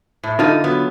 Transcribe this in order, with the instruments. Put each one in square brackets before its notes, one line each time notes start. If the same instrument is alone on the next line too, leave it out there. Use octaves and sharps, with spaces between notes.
[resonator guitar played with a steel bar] A2
[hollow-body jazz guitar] D3 F4 [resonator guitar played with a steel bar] A#3 D#4 A4
[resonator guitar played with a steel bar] F#3 B3